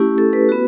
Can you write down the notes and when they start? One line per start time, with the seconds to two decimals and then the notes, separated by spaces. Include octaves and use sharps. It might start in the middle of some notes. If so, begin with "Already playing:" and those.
Already playing: A3 C#4 E4 G4
0.18 A4
0.33 B4
0.49 B3 F#4